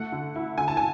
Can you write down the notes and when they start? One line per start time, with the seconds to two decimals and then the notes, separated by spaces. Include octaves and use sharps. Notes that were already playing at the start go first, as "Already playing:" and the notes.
Already playing: A3 F#5
0.12 D3
0.36 E4
0.58 D3 G#5
0.68 A5
0.77 G#5